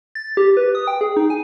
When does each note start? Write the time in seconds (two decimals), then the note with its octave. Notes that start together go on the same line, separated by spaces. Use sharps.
0.15 A6
0.37 G4
0.57 B4
0.75 D#6
0.87 G5
1.01 G#4
1.17 D#4
1.30 G#5